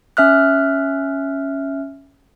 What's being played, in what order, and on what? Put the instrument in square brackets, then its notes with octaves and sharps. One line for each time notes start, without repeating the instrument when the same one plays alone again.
[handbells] C#4 E5 F6 F#6